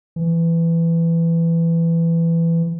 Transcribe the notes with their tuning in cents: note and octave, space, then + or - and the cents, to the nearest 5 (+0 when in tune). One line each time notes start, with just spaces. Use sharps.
E3 +15